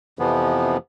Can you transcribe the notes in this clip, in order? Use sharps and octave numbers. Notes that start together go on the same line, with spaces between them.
F2 C3 E3 F3 B3